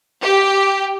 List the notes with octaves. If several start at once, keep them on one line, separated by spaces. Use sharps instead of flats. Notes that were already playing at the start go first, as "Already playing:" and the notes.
G4